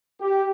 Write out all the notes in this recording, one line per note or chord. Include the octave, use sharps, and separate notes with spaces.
G4